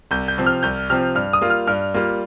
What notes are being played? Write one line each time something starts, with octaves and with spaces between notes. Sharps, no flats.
C2 G6
G6
C3 F3 C4
F6
C2 G6
C3 F3 C4 F6
G2 F6
D#6
G3 A#3 F4
F6
G2 F6
G3 A#3 F4